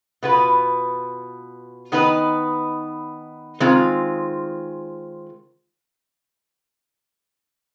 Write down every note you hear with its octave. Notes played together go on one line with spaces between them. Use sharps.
B2 B3 F4 B4
D#3 B3 D#4 B4
D#3 G#3 C4 F4